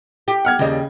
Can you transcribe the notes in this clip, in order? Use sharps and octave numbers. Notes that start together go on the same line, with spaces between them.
G4
F#5 F6 G#6
D#2 C#3 G3 D#5